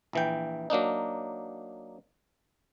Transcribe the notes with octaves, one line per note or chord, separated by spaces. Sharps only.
A#1 E3 G5
F#3 A#3 D4 D#4